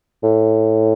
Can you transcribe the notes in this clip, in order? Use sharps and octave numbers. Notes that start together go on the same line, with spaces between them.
A2